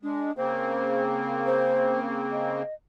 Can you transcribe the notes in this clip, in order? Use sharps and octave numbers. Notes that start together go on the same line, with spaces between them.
G#3 D4
C#3 A#3 C4 C5
C5
D#5